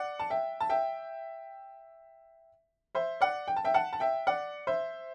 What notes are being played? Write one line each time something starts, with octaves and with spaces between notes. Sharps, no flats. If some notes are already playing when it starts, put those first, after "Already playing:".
Already playing: D5 F#5
A5
E5 G5
A5
E5 G5
C5 E5
D5 F#5
G5
A5
E5 G5
F#5 A5
A5
E5 G5
D5 F#5
C5 E5